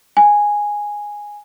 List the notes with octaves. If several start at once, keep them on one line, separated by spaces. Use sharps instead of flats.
G#5